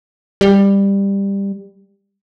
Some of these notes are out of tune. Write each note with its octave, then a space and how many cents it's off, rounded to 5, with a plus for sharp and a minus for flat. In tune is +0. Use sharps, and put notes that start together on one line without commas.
G3 +15